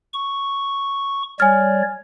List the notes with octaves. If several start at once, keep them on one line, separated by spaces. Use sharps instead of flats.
C#6
G3 C#5 D5 G#5 F6